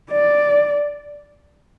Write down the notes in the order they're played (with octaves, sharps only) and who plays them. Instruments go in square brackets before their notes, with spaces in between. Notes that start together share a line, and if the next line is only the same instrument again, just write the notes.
[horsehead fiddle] D5